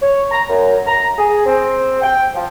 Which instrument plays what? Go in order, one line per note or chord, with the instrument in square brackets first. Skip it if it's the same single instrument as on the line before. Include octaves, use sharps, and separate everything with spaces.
[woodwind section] C#5
A#5
F#2
A#5
G#4
C4
G5
F3